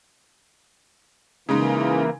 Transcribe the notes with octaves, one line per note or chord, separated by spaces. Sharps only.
C#3 E3 G#3 A#3 D#4